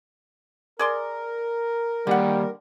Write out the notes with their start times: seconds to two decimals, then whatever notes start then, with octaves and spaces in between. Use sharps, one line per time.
0.79 G#4 A#4 D5 C6
2.07 D3 D#3 G3 A#3 G4 F#5